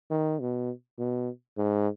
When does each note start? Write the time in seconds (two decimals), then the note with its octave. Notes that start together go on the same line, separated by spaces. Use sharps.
0.11 D#3
0.40 B2
0.99 B2
1.58 G#2